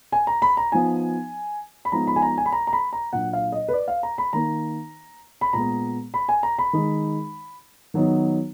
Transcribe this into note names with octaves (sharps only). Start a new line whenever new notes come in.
G#5
A#5
B5
A#5
F3 B3 D#4 G#5
B5
F3 G#3 B3 D#4 A#5
B5
G#5
A#5
G#5
B5
A#5
A#5
B5
A#5
A#2 F#3 D4 F#5
F5
D#5
B4
D5
F5
A#5
B5
D#3 A#3 D#4 A#5
B5
A#2 G#3 B3 A#5
B5
G#5
A#5
B5
D#3 G#3 D#4
D#3 F#3 B3 D#4